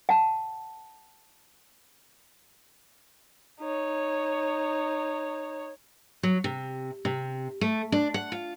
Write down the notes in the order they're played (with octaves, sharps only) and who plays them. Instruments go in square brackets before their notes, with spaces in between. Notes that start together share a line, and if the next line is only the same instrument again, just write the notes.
[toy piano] F#5 A5
[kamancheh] D#4 C#5
[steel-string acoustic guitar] F#3
C3
C3
A3
D4
F#5
F4